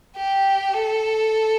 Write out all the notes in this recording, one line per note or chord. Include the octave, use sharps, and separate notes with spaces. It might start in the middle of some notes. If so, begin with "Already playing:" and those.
G4
A4